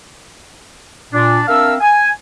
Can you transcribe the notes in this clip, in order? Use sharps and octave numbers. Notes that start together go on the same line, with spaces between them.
A#2 D4
C4 D4 A#4 E5 F5 E6
G#5